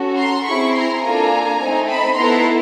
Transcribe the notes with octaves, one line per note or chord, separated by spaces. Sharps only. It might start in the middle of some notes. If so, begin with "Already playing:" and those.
Already playing: C#4 F#4 A4
A#5 C6
C4 E4 G#4 B5 C#6
A#5 C6
A#3 D4 F4 A4 G#5 A#5
A3 C4 D#4
A5 B5
B3 E4 A4 A#5 C6